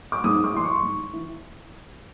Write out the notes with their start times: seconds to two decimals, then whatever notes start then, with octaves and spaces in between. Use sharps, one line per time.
0.12 D6
0.24 G#2 D#6
0.44 D6
0.54 E3 C6
0.63 C#6
0.83 G#2
1.13 E3